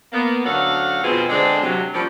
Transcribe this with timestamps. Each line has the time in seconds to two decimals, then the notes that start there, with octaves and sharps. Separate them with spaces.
0.13 A#3 B3
0.45 D2 F#3 C#4 A4 F5 F#5
1.03 F2 B2 B3 C4 F4 G#4
1.30 D3 G#3 C4 D4
1.62 C3 F#3
1.94 F3 G3 A#3 C#4 F4 D5